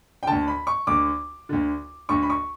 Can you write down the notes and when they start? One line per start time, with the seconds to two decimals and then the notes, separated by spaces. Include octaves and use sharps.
0.23 G5
0.27 D2 D3 A5
0.48 B5
0.67 C#6
0.87 D2 D3 D6
1.49 D2 D3
2.09 D2 D3 C#6
2.23 B5
2.30 C#6